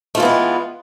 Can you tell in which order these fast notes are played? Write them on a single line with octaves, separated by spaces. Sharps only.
A3 F4 E3 B3 G#3